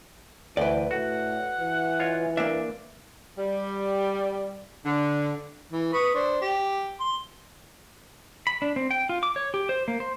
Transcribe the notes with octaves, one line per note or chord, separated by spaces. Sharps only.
D2 E3 B4 D5 G5
A2 F#4 F#5
E3
F4 C#5 D#5
A#3 D4 E5
G3
D3
E3
B4 C#6 D#6
D4 C5
G4
C6
B5
D4
C4
G5
F4
D6
C#5
G4
C5
A#3
C5